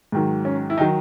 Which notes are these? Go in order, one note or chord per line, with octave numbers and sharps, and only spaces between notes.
G#2 D#3 F#3
C#4
E4
D#3 F#3 D#4